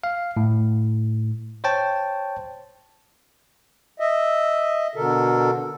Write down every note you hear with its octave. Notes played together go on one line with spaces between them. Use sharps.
F5
A2
C5 C#5 G5 A5
D#5 E5
B2 D3 A4 A#4